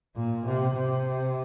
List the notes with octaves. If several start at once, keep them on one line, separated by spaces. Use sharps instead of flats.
A#2
C3
C3